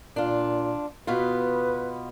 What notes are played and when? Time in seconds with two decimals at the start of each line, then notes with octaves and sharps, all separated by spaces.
0.16 A#2 D4 F4
1.07 B2 B3 F4 B4